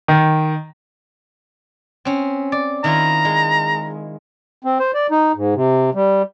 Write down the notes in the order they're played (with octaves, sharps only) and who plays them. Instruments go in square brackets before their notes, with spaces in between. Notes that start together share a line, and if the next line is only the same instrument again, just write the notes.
[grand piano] D#3
[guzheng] C4 C#4
D5
[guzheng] D#3 E4 F4 [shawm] A#5
[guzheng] G#3
[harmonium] C4
C5
D5
D#4
G#2
C3
G3